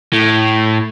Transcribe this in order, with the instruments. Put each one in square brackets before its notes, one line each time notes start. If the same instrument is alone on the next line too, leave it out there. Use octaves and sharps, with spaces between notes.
[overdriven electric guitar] A2